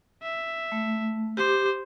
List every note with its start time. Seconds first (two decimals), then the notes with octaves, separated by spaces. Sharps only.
0.23 E5
0.72 A3
1.37 G4 C5 D6